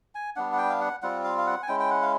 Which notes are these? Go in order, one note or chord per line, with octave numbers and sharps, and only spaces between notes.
G#5
G3 B3 D4 F#5
F#5
G5
F5
F#5
G3 C4 F4 F#5
F5
F5
F#5
G#5
G#3 C#4 E4 G5
G5
F#5
F5